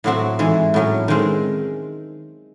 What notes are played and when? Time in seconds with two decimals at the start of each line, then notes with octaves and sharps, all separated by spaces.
0.04 A2 F#3 C4 F#4
0.39 G#2 E3 G#3
0.74 A2 F#3 C#4
1.08 D#3 G#3 C4